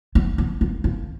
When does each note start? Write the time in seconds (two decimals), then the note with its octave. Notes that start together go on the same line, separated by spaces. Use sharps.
0.15 B3
0.38 B3
0.61 A#3
0.84 A#3